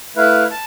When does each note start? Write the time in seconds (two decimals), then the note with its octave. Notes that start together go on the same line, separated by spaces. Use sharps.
0.16 A3 E4 B4 F5
0.51 A5